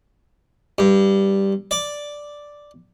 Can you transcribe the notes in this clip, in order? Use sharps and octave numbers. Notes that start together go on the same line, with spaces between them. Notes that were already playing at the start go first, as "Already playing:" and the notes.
G2
D5